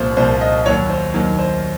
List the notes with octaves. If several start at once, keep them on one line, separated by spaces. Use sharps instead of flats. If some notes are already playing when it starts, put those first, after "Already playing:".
Already playing: C2 A#2 F3 C5
C2 A#2 F3 C5
D#5
D#2 D#3 F#3 C#5
C5
D#2 D#3 F#3
C5